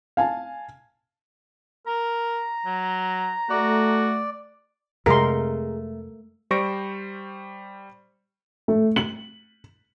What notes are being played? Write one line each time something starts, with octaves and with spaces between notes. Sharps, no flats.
F5 G#5 A5
A#4 A#5
F#3
A3 F#4 D5
F2 C3 G#3 A3 G#4 A#4 C6
G3 C5 C#6 A#6 D7
A3
F#7